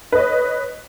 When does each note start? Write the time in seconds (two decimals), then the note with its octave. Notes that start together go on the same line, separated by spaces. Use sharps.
0.12 B4
0.15 D#5
0.18 C#5